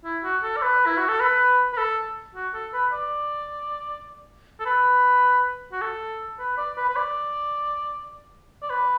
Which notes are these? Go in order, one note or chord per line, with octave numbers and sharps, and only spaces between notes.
E4
F#4
A4
D5
B4
E4
F#4
A4
B4
B4
A4
F#4
A4
B4
D5
A4
B4
F#4
A4
B4
D5
B4
B4
D5
D5
B4